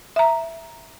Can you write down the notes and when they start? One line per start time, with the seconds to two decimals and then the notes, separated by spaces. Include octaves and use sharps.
0.16 E5 A#5